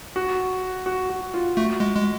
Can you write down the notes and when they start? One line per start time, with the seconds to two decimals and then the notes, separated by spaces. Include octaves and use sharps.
0.16 F#4
0.86 F#4
1.10 F#4
1.34 F4
1.57 A3 F#4
1.80 G#3
1.96 G#3